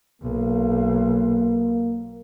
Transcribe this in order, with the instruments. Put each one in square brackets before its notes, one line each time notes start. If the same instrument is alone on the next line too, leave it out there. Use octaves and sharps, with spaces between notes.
[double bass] B1 [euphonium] A#3